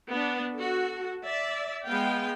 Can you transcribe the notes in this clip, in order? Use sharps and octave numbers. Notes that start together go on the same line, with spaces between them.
B3 D4
F#4 A4
D5 E5
G#3 B3 F5 G5